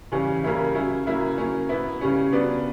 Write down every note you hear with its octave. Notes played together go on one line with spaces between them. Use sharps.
C#3 E3 G3 C#4
C#3 G3 A#3 C#4 E4
F#3 C#4 E4
C#3 F#3 A#3 E4
F#3 A#3 C#4
B2 F#3 B3 E4
C#3 G3 C#4
F#3 B3 D4